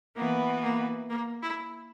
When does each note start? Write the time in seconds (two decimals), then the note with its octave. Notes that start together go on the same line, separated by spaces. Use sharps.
0.16 E3 A#3 B3 F#4 B4
0.63 A#3
1.10 A#3
1.42 E4